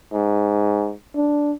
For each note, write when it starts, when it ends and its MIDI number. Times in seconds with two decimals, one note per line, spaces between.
0.13 0.92 44
1.16 1.53 62